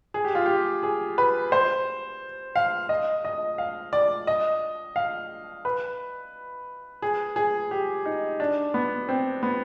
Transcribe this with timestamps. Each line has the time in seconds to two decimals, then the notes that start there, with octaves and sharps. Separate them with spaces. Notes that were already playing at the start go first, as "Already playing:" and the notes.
0.14 G#4
0.25 G4
0.35 F4
0.46 G4
0.83 G#4
1.18 B4
1.52 C5
2.56 F5
2.89 D#5
3.25 D#5
3.58 F5
3.93 D5
4.27 D#5
4.96 F5
5.65 B4
7.02 G#4
7.36 G#4
7.71 G4
8.06 D#4
8.40 D4
8.74 B3
9.09 C4
9.43 B3